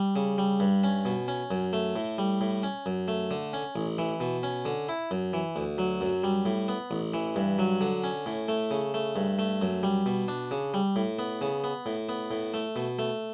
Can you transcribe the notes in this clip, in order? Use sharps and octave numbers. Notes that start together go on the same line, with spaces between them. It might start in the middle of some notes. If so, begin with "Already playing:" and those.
Already playing: G3
C#3
G3
G2
C#4
B2
C#4
F#2
A3
A2
G3
A2
C#4
F#2
A3
D3
C#4
A1
E3
B2
C#4
D3
E4
F#2
E3
D2
F#3
F#2
G3
A2
B3
A1
E3
G2
F#3
D3
C#4
A2
A3
C#3
A3
G2
A3
F#2
G3
B2
D4
C#3
G3
A2
B3
C#3
B3
A2
B3
A2
A3
B2
A3